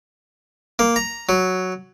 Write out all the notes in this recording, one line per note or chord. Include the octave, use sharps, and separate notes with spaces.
A#3
A#5
F#3